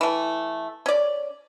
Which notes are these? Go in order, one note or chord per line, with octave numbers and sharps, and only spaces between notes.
E3 A3
C#4 D5